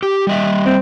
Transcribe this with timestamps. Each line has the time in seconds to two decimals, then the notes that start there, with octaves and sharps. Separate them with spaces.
0.03 G4
0.27 G3 D#5 E5
0.66 C4